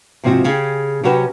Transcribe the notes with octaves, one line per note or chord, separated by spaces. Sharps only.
G#2 C3 F3 C4 F#4
C#3 G4 G#4
C3 F#3 C#4 F#4 G4 B4